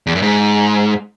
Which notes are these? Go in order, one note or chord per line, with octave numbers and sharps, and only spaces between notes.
E2
F#2
G#2